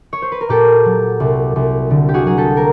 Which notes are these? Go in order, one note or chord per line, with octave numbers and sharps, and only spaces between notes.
C#5
C5
B4
A#4
A#2 G4 A4
F#3
C2
C2
D3
G4
F#4 G#4
F#3 G#4
G4 A4
A#4